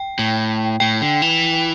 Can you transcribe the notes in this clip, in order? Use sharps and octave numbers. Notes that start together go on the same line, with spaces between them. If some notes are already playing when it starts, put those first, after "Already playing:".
Already playing: G5
A2
A2 G5
D3
E3